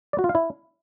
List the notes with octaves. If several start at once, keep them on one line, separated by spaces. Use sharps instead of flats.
D5
F#4
F4
F5
E4